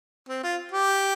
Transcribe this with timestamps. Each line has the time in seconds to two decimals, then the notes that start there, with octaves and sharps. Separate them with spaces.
0.29 C4
0.43 F4
0.72 G4